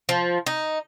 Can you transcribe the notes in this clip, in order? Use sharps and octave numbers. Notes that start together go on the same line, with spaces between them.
F3
D#4